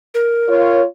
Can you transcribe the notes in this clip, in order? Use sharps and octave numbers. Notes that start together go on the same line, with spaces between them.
A#4
F4 C#5